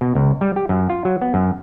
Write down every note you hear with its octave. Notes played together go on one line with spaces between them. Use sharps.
B2
C#2
G3
G4
F#2
F4
F#3
B3
F#2